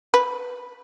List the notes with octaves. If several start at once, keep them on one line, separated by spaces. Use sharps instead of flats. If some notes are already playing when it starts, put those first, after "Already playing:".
B4